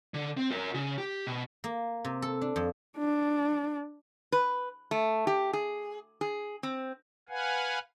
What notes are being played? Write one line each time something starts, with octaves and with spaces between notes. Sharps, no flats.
D3
C4
F#4 A#4
C#3
G4
B2
A#3
C3
A4
D4
F2
D4
B4
A3
G4
G#4
G#4
C4
B4 F5 F#5 G#5